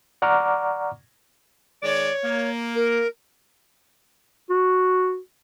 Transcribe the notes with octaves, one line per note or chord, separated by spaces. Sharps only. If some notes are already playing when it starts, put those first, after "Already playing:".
D5 F#5 A#5 C#6 D6 F6
D#3 G#3 C#5 D5
A#3
A#4
F#4